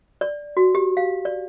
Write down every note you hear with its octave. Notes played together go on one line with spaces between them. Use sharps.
D5
F#4
G4
F5
D5